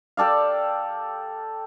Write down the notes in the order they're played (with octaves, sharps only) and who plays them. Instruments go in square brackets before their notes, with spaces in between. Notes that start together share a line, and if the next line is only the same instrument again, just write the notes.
[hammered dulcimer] G4 A4 D5 F5